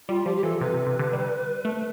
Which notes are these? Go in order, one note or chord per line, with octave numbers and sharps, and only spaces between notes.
G3 F4
F3 G4
G4
E3 A4
C3 B4
C3
C3
D3
G3
A3